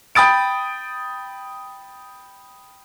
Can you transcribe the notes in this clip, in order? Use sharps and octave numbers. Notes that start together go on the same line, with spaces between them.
G5 B5 D#6 A6 D7